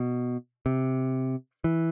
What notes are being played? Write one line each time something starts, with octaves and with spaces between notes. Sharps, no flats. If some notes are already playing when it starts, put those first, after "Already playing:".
Already playing: B2
C3
E3